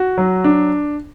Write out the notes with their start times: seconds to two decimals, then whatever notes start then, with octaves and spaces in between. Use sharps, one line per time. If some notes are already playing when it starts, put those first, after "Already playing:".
Already playing: F#4
0.18 F#3
0.44 D4